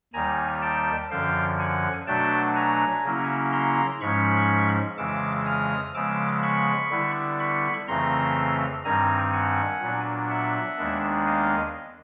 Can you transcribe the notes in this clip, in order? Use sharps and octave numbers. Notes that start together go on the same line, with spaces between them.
D#2 D#3 G3 G#5 A#5
G5 A5
F#2 D3 F3 F5 G5
F#5 G#5
B2 F#3 A3 D4 G5 A5
G#5 A#5
C#3 F#3 A#3 C#4 E4
A#5 C6
G#2 F3 G#3 C#4 B5 C#6
F2 C#3 E3 G#3 D6 E6
D#6 F6
C#3 F3 G#3 B3 D6 E6
B5 C#6
D3 G3 B3 E4
B5 C#6
F2 C#3 E3 A3 C4 A#5 C6
G2 D#3 G3 C4 G#5 A#5
F#5 G#5
A#2 F#3 B3 D4
E5 F#5
D#2 D#3 G#3 B3 D4
D#5 F5